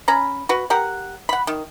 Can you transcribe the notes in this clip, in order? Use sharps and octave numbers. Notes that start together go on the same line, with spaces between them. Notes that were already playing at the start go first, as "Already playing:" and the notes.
C#4 A#5 B5
F#4 B4
G4 A#4 F#5
F#5 B5
D#3